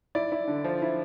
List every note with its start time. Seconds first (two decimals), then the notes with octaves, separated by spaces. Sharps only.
0.15 E4 D5
0.32 E4
0.47 D3
0.64 F3
0.82 E4